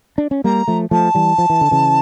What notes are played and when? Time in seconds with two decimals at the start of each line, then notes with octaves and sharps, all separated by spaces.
0.18 D4
0.31 C#4
0.44 G3 A#3 A#5
0.68 F3 A3
0.91 F3 A3 A5
1.15 E3 G3
1.38 F3
1.50 E3
1.61 D3
1.71 C#3 E3